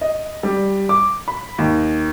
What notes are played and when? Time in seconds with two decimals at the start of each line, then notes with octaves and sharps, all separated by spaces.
0.01 D#5
0.43 G3
0.89 D6
1.28 B5
1.58 D#2